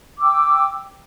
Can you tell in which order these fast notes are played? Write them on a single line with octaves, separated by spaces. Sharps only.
D6 E6 G5